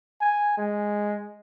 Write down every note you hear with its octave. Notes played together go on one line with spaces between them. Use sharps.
G#5
G#3